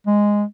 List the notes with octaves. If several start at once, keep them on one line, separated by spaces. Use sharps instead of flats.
G#3